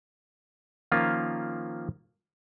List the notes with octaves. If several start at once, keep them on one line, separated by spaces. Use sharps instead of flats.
D#3 F3 A#3 C#4 F4